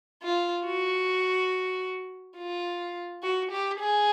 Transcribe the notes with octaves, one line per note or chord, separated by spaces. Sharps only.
F4
F#4
F4
F#4
G4
G#4